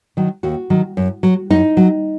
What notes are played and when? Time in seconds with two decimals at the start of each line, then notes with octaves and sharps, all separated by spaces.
0.17 D#3 F#3
0.43 D#2 F#4
0.70 D#3 F#3
0.97 F#2
1.23 F#3
1.50 F#2 D#4
1.77 F#3